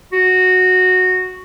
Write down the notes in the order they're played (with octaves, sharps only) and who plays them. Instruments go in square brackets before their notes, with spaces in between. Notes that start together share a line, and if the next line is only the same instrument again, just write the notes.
[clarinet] F#4